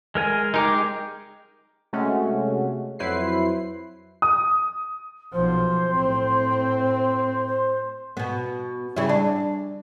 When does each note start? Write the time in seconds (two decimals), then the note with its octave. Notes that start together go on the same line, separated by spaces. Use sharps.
0.15 G#3 A#4 G#5
0.54 G#3 D#4 G4 A#4 D6
1.93 C3 G#3 A3 C#4 F#4
2.99 F2 F#3 E4 B4 C5 C7
4.22 D#6
5.32 B1 F3 C5
5.91 A2 C4
7.47 C5
8.17 B2 B3
8.96 C#3 G3 E4
9.09 D4